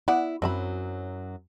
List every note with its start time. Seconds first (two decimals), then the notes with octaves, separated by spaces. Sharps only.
0.08 B3 E4 D5 F#5
0.42 F#2 F#3 C4 E5 B5